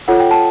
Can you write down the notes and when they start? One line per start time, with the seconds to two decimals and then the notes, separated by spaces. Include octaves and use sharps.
0.08 F4 A4 C#5 F#5
0.20 G5
0.31 A5